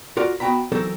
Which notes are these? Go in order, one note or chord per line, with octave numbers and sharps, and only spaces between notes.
F4 F#4 A#4 D5
B3 F#4 G5 A#5 B5
E3 F#3 C4 D#4 A4 A#4